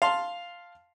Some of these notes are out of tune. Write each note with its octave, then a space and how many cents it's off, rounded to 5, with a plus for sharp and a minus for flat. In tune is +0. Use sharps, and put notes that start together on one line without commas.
F5 +0 A5 +0 C6 +0